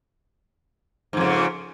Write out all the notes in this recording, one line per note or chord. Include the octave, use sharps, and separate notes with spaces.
F2 G#2 C#3